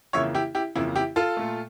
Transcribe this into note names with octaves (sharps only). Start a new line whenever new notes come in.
F2 C#3 E3 A#3 C#5 E5
E4 G4
E4 G4
F2 C#3 E3 A#3 E4
E4 G4
F4 A4
A#2 A3